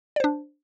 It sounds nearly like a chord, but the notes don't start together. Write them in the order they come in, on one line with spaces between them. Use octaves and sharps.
D5 C5 D4